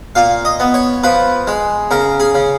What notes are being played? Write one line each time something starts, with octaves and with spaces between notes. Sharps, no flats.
A#2 F5
D#5
B3
C#5
F3 B4
G#3
C#3 A#4
G#4
C#3